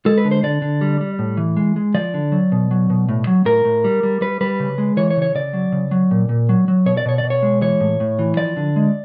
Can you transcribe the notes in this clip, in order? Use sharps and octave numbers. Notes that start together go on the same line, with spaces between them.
G#3 A4
B4
D3
C5
D3 D5
D3
G3
G3
A2
E3
G#3
G#3
F3 D5
D3
F#3
B2
F#3
B2
A2
F#3
A2 A#4
A2
G3
G3
G3 B4
G3 B4
C#3
G#3
E3 C#5
C#5
C#3
C#5
C#3 D5
F#3
C#3
F#3
A#2
A#2
F#3
F#3
B2 C#5
D5
B2 C#5
D5
B2
C#5
G#3
E3 C#5
A2
A2
E3
F3 D5
D3
G#3